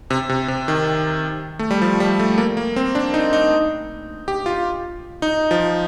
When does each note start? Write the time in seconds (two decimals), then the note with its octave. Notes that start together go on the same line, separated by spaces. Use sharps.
0.10 C3
0.29 C3
0.48 C3
0.68 D#3
1.59 A3
1.71 G3
1.82 F3
2.00 G3
2.20 A3
2.38 A#3
2.57 A#3
2.76 C4
2.95 D4
3.14 D#4
3.33 D#4
4.28 G4
4.46 F4
5.22 D#4
5.51 F3